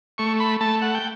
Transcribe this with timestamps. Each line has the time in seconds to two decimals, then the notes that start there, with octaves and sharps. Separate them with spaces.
0.18 A3 C#6
0.40 B5
0.61 A3 A5
0.82 F#5
0.95 G5